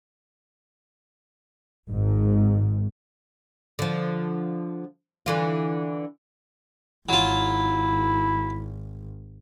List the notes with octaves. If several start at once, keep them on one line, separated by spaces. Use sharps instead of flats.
G#1 G#2
D3 F3
D3 E3 F4
G#1 F#3 E4 F4